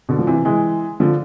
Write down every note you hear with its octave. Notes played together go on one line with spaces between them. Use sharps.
B2 D3
F3
C3 E3
E3 G#3
D3 F3